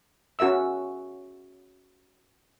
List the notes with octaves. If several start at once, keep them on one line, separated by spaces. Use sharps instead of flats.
C#4 F#4 A#4 E5 E6